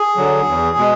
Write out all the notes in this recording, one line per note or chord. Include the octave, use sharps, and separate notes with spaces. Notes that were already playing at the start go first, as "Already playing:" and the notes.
Already playing: G#4
D3 F#3
E2
B2 G#3